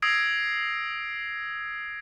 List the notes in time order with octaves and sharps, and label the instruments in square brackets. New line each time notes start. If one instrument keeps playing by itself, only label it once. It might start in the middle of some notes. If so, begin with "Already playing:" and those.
[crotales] D#6 E6 G#6 A#6 C7 D7